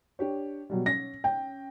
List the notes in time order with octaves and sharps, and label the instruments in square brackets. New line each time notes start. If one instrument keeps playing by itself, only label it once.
[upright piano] D4 G4 C#5
B2 F#3 G3
[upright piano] C#4 [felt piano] A#6
[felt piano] G5